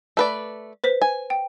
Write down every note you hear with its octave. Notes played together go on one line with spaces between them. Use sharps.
A3 B4 D5
B4 C5 B6
G#5
G5